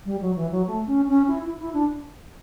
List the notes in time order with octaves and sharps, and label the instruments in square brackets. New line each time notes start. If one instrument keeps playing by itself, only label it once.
[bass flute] G3
F#3
E3
F#3
A3
C#4
C#4
E4
E4
E4
D4